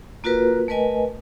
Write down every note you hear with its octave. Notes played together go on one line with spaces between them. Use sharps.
A#3 F4 F#4 A#4 B4
A3 A#4 B4 D#5 G#5